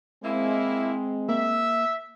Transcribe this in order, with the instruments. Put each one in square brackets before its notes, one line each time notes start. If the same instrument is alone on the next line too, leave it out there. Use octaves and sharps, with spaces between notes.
[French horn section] G#3 C4 [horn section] A#3 E4
[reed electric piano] A#3 [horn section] E5